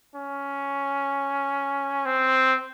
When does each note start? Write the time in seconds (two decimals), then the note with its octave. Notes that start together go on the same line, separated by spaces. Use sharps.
0.16 C#4
2.05 C4